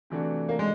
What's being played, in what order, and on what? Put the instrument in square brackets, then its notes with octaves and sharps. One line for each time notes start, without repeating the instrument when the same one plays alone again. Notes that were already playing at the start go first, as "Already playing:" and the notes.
[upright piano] C3 E3 A3 D4 F#4
[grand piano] A#3
G#3